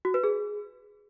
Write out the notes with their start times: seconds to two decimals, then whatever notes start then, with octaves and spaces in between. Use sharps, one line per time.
0.05 F#4
0.14 B4
0.24 G#4